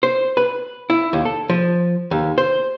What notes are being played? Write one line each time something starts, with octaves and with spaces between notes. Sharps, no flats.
C5
B4
E4
D#2
A4
F3
D#2
C5